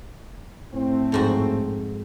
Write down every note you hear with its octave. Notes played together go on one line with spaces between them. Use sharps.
A2 A3 C4
F2 G#2 F#4